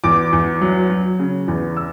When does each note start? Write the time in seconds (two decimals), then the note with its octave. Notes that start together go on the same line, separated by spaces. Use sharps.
0.04 E2 D6
0.33 E2
0.61 F#3
0.90 F#3
1.19 C#3
1.48 E2
1.77 E6